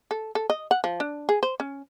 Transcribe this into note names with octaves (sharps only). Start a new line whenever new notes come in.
A4
A4
D#5
F#5
F3
D4
G#4
C5
C#4